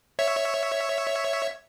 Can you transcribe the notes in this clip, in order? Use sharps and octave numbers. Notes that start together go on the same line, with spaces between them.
C#5 E5